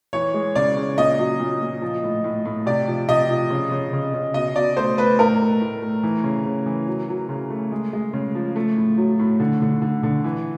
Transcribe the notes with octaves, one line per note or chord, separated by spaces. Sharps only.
E3 C#5
G#3
C#3 D5
C#3
A#2 D#5
F#3
A#2
A#2
F3
A2
A2
A2
C3 D5
F3
C3 D#5
F3
C#3
C#3
C#3
C#3
B2 D#5
B2 D5
A3 C5
A3 B4
A2 A#4
A3
A2
A3
E3
C#3
C#3
E3
F#3
F#3
C#3
A3
G#3
G#3
C#3
F3
A3
A2
F#3
A2
D3
D3
D3
D3
E3